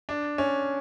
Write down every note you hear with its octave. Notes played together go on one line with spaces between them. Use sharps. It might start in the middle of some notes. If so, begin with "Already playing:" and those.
D4
C#4